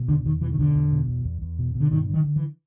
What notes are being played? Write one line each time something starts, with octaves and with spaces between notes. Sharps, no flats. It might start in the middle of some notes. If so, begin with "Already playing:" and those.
Already playing: B2
E2 D3
E2 D#3
B2 E3
D#3
E2 D3
E2
B2
E2
E2
E2
B2
B2
D3
G2 D#3
D3
D#3
D3
E3